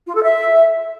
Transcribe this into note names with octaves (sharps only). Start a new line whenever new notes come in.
F4
A4
E5